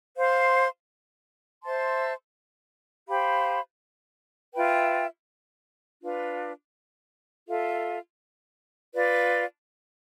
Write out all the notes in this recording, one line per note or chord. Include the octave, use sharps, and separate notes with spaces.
C5 F5 C6
C5 E5 A5 C6
G4 C5 F5 B5
F4 B4 E5 G5
D4 F4 B4
F4 A4 E5
F4 B4 D5